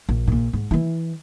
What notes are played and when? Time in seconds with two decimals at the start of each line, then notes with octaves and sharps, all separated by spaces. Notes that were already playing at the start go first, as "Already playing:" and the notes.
0.09 A#1
0.27 A#1 A#2
0.53 G#2
0.71 E3 E4